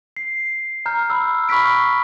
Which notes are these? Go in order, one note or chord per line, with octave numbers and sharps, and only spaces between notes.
C7
A#5 F6 G6
B5 E6
B5 C#6 F6 B6 D7